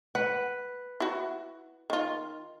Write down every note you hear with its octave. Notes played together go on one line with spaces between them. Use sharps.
B4 F#5
E4 F#4
D#3 F4